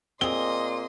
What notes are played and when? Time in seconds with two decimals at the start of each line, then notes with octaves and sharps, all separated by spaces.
0.21 A#2 C4 G#4 D#5 C6 G7